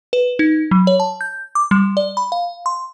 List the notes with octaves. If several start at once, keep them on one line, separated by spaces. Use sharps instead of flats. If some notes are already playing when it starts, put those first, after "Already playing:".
B4
D#4
F#3
C#5
A5
G6
D6
G3
D5
B5
F5
C6